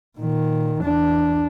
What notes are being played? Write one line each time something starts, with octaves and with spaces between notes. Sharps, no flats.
A#2 D#3
E2 D4